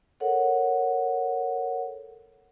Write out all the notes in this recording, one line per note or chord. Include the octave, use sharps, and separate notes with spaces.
A4 A#4 C#5 F#5